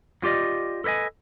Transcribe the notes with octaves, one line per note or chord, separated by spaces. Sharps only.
F#3 F4 G4 D5 D#5
A4 B4 C#5 D#5 G#5